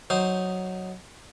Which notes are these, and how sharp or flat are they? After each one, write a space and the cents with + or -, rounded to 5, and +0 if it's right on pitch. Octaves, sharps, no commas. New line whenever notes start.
F#3 +0 D#4 +0 C5 +0